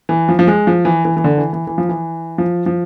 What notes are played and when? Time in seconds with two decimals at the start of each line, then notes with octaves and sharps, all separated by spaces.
0.09 E3
0.29 F3
0.39 F3
0.47 G#3
0.67 F3
0.85 E3
1.05 E3
1.17 E3
1.24 D3
1.38 E3
1.53 E3
1.67 E3
1.78 F3
1.89 E3
2.38 F3
2.66 F3